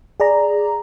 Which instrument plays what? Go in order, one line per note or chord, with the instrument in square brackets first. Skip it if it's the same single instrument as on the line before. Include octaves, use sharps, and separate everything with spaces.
[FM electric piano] G#4 D5 A#5